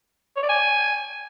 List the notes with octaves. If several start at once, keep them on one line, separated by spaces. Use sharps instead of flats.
C#5
D5
G#5